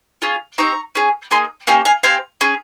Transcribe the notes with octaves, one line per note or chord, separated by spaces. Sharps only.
C#4 F4 G#4
C4 D#4 G4 A#5 C#6
C#4 G#4
A#3 D#4 G#4 G#5 C6
A#3 C#4 G4 F5 G#5
F5 G#5
C4 G4 F5 G#5
C#4 G#4